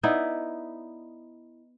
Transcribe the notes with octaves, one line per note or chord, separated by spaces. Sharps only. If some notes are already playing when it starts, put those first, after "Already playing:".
B3 D#4 E4 D5